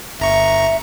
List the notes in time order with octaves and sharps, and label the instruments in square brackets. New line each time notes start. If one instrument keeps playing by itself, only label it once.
[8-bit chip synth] G1 A#5 C#6 [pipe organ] E5